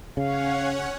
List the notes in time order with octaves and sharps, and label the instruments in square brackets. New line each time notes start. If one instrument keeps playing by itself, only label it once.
[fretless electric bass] C#3 [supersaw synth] C#4 C#5 F#5 [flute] F5